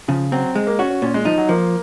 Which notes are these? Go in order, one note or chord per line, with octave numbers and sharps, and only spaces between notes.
C#3 F3
F#3 C4
G#3
A#3
C#4 F#4
C#4
A#2 C#4
G#3
F3 D#4
F#3
F3 A#3